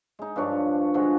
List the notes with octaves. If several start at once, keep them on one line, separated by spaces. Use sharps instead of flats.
G#3 D#4
G2 F3 D4 C#5
D3 F3 G#3 F#4